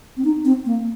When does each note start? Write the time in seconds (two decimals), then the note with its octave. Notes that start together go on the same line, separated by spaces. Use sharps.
0.17 C4
0.24 D#4
0.45 C4
0.66 A#3